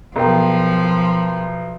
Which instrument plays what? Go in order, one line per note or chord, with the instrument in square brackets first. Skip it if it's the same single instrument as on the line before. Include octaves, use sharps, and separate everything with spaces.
[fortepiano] B1 [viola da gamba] F3 [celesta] G#4 A#4 G5